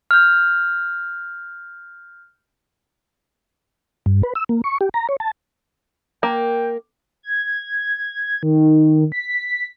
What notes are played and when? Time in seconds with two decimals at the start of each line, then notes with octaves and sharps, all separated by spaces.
0.11 F6 G6
4.06 G2
4.23 B4
4.35 E6
4.49 A#3
4.64 C#6
4.81 G4
4.94 A#5
5.09 C#5
5.20 A5
6.23 A#3 G5
7.23 G#6
8.43 D#3
9.12 B6